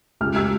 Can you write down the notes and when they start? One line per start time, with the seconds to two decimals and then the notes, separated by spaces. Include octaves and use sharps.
0.21 C#2 F6
0.36 E6